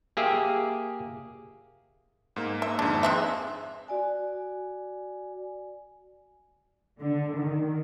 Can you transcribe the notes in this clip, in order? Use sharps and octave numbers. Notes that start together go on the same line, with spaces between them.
A#3 G4 G#4 E5
G#2 A#3
E5
G#1 F2 G#2 D4
G#3 C4 E5
F#4 D5 G#5
D3
D#3